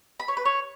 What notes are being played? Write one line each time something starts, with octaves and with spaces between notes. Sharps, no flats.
B5
C#5
B4
C#5